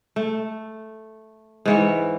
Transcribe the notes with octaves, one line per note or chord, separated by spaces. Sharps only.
A3
G#2 E3 C#5